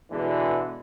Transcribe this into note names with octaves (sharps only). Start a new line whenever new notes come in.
B2 D3 E3 G#3